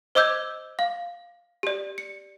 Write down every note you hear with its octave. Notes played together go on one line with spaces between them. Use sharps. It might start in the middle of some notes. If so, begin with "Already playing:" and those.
C5 D#5 D6 E6 G6 G#6
F5
G4 D5
C#7